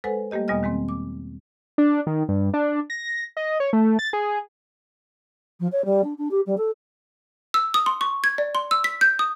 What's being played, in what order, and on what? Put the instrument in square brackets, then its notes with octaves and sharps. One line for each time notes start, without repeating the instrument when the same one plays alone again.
[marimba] G#3 A4 B4 C5 F#5 G#5
G3 A3 A#3 G4 D#5
E2 B2 G3 B3 D#5 F6
D#3 G#3 A#3 C4
D6
[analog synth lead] D4
D#3
G2
D4
A#6
D#5
C#5
A3
A6
G#4
[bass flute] F3
C#5
G3
D4
D4
G4
G3
A4
[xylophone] E6
D#6
C6
C#6
G#6
D5
C6
E6
B6
G6
D#6